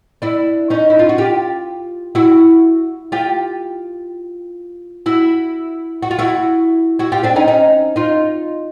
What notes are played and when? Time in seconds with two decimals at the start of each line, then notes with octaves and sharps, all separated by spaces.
0.22 D4 E4
0.70 C#4 D#4
0.90 E4
0.99 F4
1.09 F#4
1.18 F4 G4
2.15 E4 F#4
3.12 F4 G4
5.06 E4 F#4
6.02 F#4
6.11 F4
6.19 E4 F#4
6.99 E4 F#4
7.12 F4 G4
7.23 C4 D4
7.36 C#4 D#4
7.48 C#4 D#4
7.96 D#4 F4